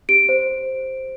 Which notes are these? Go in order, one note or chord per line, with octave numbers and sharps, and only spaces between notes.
G4 D7
C5